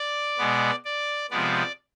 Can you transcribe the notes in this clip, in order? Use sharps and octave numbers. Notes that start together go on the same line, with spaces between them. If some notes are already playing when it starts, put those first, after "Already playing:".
Already playing: D5
B2 G#3 B3
D5
C3 F3 G#3 B3 D5